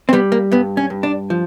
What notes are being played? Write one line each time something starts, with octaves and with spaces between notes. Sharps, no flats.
C4
G3 B3
A#3
G2 B3
C#4
G2
D4
F3